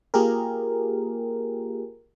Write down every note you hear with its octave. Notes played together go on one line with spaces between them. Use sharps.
A#3 F4 G4 G#4 A#4